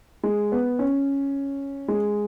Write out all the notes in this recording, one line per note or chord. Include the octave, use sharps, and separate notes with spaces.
G#3
B3
C#4
G#3